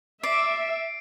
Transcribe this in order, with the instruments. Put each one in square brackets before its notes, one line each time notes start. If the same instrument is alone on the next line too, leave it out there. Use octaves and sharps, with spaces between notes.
[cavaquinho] D5 [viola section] E5 [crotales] C7 D7